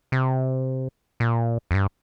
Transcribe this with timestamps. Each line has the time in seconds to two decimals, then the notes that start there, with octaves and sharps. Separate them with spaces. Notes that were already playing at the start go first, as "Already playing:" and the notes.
0.12 C3
1.20 A#2
1.71 F2
1.74 G2